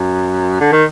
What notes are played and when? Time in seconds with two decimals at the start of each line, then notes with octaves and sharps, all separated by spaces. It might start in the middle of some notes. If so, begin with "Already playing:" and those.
Already playing: F#2
0.61 D3
0.73 D#3